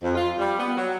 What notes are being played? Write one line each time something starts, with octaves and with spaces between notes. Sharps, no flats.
F2
F4
G3
B3
F#3